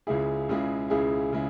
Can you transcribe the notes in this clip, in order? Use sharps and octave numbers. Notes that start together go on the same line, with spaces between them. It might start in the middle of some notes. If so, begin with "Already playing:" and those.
C#2 C#3 G#3 E4 G#4
C#2 C#3 G#3 E4 G#4
C#2 C#3 G#3 E4 G#4
C#3 G#3 E4